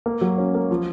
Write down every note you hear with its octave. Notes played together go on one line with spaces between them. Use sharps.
A#3
F#3
C#4
A#3
F3